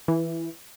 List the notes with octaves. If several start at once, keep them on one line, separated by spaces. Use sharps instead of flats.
E3